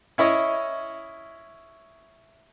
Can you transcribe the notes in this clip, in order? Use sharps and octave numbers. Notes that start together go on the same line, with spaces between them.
C#4 E4 C#5 D#5